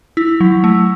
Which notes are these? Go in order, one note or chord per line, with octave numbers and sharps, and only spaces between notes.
E4
F#3
A3